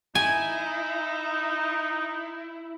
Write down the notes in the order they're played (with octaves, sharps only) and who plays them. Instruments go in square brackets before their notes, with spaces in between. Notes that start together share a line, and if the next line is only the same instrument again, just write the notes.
[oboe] D#4 [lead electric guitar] E4 [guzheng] G#5